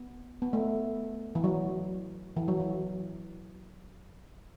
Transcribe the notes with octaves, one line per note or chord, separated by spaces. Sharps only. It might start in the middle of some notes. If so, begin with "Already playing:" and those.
Already playing: B3
B3
A3
E3
F#3
E3
F#3
E3